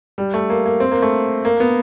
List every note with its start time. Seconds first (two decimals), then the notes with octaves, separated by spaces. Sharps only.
0.18 G3
0.34 A3
0.50 A#3
0.66 A#3
0.80 C4
0.91 A#3
1.02 A3
1.45 A#3
1.60 B3